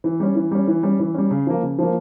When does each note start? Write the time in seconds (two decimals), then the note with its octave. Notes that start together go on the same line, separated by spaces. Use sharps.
0.04 E3
0.20 G3 C#4
0.35 E3
0.51 G3 C#4
0.67 E3
0.83 G3 C#4
0.99 E3
1.14 G3 C#4
1.31 C#3
1.47 F3 A#3
1.63 C#3
1.78 F3 A#3